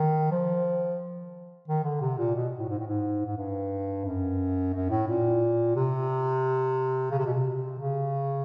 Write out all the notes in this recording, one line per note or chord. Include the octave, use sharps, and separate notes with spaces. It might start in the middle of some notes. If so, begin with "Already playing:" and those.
Already playing: D#3
F3
D#3
D3
C3
A#2
B2
A2
G#2
A2
G#2
G#2
G2
F#2
F#2
A2
A#2
C3
C#3
C3
B2
C3
C#3